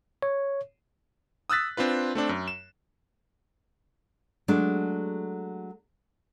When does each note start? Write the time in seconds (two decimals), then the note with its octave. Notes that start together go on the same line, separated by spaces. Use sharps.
0.22 C#5
1.50 D#6 E6 F#6 A6 B6
1.77 C4 D4 F4 B4
2.15 A3 C4 D4
2.29 F#2
2.48 E7
4.48 F#3 G#3 A3 D4